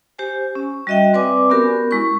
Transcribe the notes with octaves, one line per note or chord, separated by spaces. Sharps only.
G4 C5 G#5
C#4
G3 F#4 D#5 E5 G5
C4 B4 D5 G#5 D6
B3 C#4 F#4 G4 A#4
G#3 E4 C#6